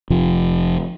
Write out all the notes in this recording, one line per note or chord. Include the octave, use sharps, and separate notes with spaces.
F1 C3 F3